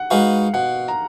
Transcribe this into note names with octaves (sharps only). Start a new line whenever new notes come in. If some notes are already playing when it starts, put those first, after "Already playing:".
Already playing: F#5
G#3 D#4 F#4 B4 F5
B2 F#5
A#5